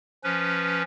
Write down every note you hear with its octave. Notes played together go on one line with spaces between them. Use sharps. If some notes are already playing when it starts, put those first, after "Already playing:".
F3 C#4 B4